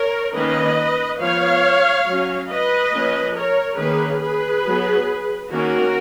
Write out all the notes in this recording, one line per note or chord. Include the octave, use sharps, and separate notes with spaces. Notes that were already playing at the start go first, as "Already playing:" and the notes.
Already playing: A#4 C#5
D#3 A#3 C#4 B4 D#5
F3 B3 C#5 F5
F#3 C#4
B4 D#5
F3 A#3 C#4
A#4 C#5
D#3 A#3 C#4 G#4 B4
G#4 B4
F#3 B3
D#3 A#3 C#4 F#4 A#4